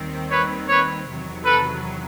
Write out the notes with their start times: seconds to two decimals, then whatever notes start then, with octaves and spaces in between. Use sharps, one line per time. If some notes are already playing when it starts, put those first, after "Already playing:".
Already playing: D#2 D#3 G3 C4
0.31 B4 C#5
0.69 B4 C#5
1.07 E2 C3 D#3 F#3
1.45 A4 B4